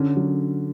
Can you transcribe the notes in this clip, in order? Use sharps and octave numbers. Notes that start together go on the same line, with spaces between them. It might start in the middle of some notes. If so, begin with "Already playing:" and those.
Already playing: D3 C#4
F#3